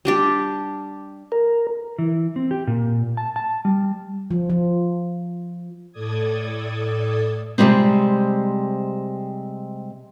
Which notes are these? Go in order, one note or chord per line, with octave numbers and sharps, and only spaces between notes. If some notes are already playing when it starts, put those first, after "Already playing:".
G3 D4 G4
A#4
E3
C4
G4
A#2
A5
A5
G3
F3
F3
A2 A4 D5 D#6 G#6
C3 D#3 G3 G#3 C4